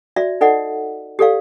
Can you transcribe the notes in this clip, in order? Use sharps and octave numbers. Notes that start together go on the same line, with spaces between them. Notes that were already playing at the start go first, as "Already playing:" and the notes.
F#4 D5 E5
D#4 A4 D5 D#5 F#5
G4 A4 D5 F5